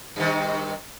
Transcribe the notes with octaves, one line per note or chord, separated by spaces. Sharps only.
G2 C3 D#3